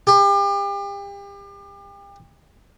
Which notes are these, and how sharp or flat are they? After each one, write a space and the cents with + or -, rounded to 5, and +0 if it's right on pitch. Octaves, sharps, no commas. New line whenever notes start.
G4 +35